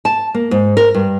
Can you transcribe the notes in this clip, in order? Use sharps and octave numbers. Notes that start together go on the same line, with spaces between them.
A5
A#3
G#2
A#4
G2